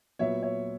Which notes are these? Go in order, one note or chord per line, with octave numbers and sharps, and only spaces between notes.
A#2 F#3 B3 C#5 E5
C#5 E5